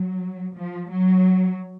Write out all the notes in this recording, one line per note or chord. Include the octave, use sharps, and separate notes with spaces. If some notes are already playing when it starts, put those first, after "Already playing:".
Already playing: F#3
F3
F#3